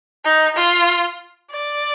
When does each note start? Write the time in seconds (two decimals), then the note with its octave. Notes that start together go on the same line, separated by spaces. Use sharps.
0.25 D#4
0.56 F4
1.51 D5